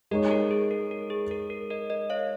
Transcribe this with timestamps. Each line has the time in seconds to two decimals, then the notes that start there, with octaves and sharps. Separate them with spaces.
0.11 G#3 D#4 A#4 C#5 D#5
0.31 A#4
0.51 G#4
0.71 A#4
0.91 A#4
1.10 G#4
1.31 A#4
1.50 A#4
1.70 A#4 D#5
1.90 A#4 D#5
2.10 C#5 F5